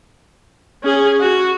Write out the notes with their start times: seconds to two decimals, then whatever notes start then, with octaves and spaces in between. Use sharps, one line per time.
0.84 C#4 G#4
1.20 F#4